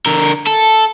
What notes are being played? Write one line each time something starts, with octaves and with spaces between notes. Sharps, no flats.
D3 A#4
A4